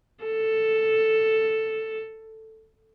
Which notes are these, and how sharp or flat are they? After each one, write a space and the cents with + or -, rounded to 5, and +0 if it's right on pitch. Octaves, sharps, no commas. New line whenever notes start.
A4 +0